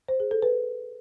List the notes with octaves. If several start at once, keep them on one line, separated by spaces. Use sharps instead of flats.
C5
G#4
A4
B4